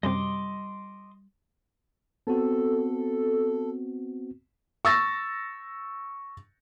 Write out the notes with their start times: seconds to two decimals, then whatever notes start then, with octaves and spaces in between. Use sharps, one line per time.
0.03 F#2 C3 G3 D#5 C6 D6
2.27 B3 C4 F#4 A4
4.85 C#6 E6 A6 A#6